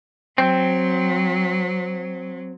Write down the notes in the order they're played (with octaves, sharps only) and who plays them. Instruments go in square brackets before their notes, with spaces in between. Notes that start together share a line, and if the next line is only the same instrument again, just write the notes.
[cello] F#3 [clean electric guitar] C4